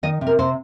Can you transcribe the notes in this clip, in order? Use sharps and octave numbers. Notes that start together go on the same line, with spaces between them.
D#3 D#5
C3
A#4
C3 C5